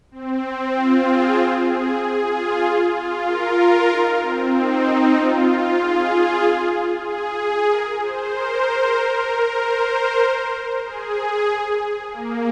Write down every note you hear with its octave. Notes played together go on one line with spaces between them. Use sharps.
C4
F4
G#4
C5
G#4
G#4
F4
F4
F4
A#4
F4
D#4
C4
D#4
F4
G#4
G#4
A#4
C5
A#4
A#4
A#4
C5
A#4
G#4
A#3